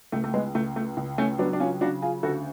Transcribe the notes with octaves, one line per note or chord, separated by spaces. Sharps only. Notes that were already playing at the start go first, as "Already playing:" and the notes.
C#2 A3
A3
G#3 B3
C#2 A3
A3
C#2
A3 C#4
F#3 B3 D4
D4
C#4 F4
C#3 D4 F#4
F4 G#4
D2 F#4 A4